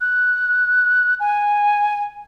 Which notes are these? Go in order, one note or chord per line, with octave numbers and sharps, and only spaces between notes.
F#6
G#5